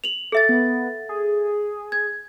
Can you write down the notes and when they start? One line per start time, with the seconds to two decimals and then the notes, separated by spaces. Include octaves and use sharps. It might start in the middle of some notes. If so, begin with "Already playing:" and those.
0.04 F7 F#7
0.32 A4 E5 A6
0.49 B3
1.09 G#4
1.92 G#6